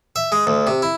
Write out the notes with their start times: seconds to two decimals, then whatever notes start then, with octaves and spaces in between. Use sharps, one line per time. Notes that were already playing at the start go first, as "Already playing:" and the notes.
0.16 E5
0.32 G#3
0.47 D2
0.67 C3
0.82 E4